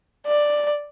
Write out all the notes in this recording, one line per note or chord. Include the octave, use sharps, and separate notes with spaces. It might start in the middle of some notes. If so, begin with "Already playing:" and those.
D5